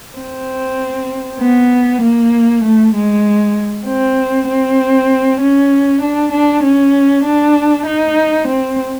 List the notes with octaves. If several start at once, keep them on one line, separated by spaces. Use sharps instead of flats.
C4
B3
A#3
A3
G#3
C4
C4
C#4
D4
D4
C#4
D4
D#4
C4